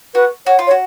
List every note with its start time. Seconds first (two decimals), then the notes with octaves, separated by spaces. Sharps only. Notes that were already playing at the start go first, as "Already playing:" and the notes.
0.15 F#4 B4
0.46 F#4 C#5
0.59 F4
0.67 C#5
0.71 F#4